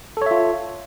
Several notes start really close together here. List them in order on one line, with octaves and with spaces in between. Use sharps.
A4 C#5 E5 F4